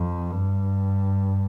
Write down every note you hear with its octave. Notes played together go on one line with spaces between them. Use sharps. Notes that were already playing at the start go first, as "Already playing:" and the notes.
Already playing: F2
G2